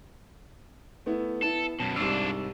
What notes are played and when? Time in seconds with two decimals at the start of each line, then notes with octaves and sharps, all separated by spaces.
1.06 A3 B3 E4
1.42 B3 E4 A4
1.80 F#2 B2 A5
1.96 C2 G#2 D4 F4 E6